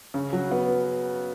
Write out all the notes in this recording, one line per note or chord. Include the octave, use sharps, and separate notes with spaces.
C#3
F#3
B3